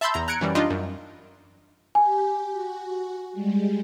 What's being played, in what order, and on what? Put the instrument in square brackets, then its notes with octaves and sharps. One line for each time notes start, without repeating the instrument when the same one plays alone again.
[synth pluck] E5 A5 B5 C6 E6 G6
E2 A#5
A#5 F#6 G#6 C#7 D7
F#2 E3 G3
G3 D4 D#4 F4 D#5
F#2
[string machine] G4 [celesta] G#5
[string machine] F#4
G3 G#3